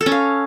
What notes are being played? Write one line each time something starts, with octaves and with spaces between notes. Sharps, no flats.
A4
C#4
F5